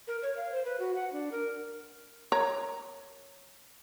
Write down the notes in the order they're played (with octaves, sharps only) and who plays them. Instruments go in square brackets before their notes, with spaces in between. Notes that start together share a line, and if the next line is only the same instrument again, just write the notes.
[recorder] A#4
C#5
F5
C5
B4
F#4
F#5
D4
A#4
[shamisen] A#4 C#5 A#5